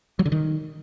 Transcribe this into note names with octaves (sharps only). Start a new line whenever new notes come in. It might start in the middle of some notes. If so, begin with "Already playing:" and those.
F#3
D3
D#3